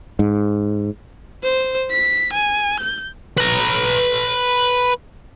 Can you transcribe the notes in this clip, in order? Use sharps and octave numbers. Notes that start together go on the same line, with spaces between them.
G#2
C5
B6
G#5
G6
B4 A#5